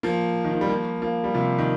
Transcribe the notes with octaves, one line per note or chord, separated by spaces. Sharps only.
F3 A#3
D#3
F3
G3
F3 A#3
F3 A#3
G3
C3 F3
D#3